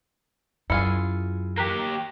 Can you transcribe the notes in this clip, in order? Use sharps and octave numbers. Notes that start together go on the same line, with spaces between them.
F#2 E4 F4 G#4 C#7
A#3 G4 A#5 F#6 B6